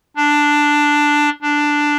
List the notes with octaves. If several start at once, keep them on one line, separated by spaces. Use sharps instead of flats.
D4
D4